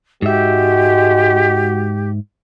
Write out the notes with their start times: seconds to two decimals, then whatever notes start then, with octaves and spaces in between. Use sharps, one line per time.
0.22 G#2 G#3 F#4 G4 E5